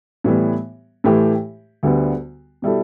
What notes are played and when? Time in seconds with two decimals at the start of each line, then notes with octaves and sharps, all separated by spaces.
0.24 A2 E3 G3 B3
1.04 A2 E3 A3 G4
1.83 D2 D3 G3 B3
2.62 B2 G3 E4 A4